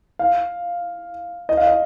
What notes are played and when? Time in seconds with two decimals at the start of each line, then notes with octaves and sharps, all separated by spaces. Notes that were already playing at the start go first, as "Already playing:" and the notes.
0.19 F5
1.49 D#5
1.57 F5
1.67 D#5